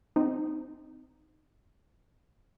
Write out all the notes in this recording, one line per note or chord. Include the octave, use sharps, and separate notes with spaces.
C4 D#4